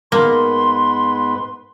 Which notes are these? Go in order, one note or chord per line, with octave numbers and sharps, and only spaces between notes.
G#2 A#3 B3 B4 C6